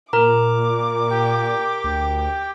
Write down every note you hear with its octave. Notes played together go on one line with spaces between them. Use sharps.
A#2 A#4 A#5 D6
G4 G5
D2